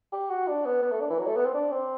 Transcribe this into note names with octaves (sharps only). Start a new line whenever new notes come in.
G4
F#4
D4
B3
B3
A3
D4
E3
F#3
A3
B3
C4
D4
C4